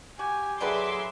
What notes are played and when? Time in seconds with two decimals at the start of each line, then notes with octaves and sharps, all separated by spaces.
0.19 F#4 G4 G#5
0.61 D3 F#3 G3 G#4 B4 E5 C6 D6